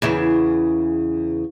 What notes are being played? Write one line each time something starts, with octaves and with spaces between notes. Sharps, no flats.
E2 C#3 E4